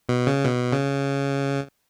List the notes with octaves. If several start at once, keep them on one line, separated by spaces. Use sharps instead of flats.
B2
C#3
B2
C#3